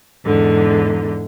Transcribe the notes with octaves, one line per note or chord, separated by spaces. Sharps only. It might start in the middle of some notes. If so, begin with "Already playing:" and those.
E2 G#2 D3